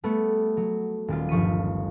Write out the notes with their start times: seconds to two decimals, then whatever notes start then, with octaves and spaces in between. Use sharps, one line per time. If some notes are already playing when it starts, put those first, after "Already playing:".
0.04 G3 A3 B3
0.57 F#3
1.08 D#1 G3 F4
1.29 G1 F3 C#6 B6 D#7